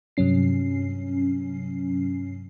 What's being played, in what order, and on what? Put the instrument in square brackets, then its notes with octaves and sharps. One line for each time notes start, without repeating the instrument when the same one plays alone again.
[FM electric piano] G2 C3 F#3 C#4 C7